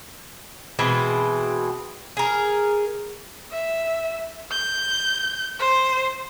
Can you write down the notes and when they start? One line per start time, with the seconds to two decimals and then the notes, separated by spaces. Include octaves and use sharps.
0.79 B2 E3 G#3 C4
2.17 G#4 A#4
3.52 E5
4.51 G6
5.59 C5